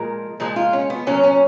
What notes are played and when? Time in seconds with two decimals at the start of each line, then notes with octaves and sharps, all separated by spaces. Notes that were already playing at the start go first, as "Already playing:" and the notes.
Already playing: A#2 F3 G#3 A#4
0.40 A#2 F3 G#3
0.56 F4
0.73 C#4
0.90 B3
1.07 A#2 F#3 C#4
1.23 C#4